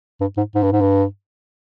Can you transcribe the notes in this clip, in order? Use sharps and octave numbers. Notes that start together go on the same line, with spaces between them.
G2
G#2
G#2
G2
G#2
G2